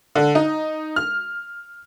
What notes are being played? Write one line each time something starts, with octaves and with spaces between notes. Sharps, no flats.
D3
D#4
F6